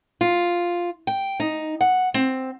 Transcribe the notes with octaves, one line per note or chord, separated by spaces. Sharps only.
F4
G5
D#4
F#5
C4